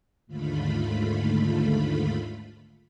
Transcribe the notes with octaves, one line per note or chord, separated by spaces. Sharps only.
D#2 G#2 D3 A3 F4 B5